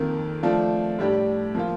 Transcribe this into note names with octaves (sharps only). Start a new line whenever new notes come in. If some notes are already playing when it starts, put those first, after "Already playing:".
Already playing: F2 D#3 A#3
F3 A3 D4 F4
A2 G3 D4 G4
F3 A#3 F4